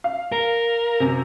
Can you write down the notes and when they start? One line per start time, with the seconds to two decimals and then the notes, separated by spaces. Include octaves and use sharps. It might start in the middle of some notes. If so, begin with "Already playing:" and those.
0.04 F5
0.32 A#4
1.00 F#2 C3